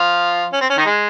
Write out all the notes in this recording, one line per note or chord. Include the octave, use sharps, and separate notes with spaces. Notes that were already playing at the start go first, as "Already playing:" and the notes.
Already playing: F3 F4
C#4
C4
C#4
D#3 D#4
G#3